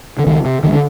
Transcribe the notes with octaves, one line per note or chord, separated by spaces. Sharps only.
D3
C#2 D#3
C3
C#2 D#3
D3